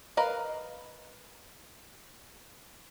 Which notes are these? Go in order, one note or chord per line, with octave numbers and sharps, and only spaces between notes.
A#4 B4 D#5 F5